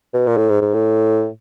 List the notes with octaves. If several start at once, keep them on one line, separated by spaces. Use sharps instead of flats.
B2
A#2
A2
G#2
G#2
A2